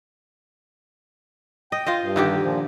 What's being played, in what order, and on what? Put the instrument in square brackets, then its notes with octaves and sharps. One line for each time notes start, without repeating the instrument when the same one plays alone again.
[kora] D#5 [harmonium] G5
[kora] F4 C5 D#5
[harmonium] G2
[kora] D3 D#3 G4
[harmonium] A#2 F3